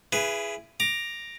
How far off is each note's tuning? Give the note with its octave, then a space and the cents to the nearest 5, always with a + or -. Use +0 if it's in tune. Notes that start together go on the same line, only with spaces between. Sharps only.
E4 +30 G#4 +0 B4 +0
A#5 +0 D6 +15